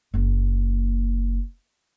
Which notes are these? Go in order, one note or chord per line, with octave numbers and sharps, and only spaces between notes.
F#1 A#3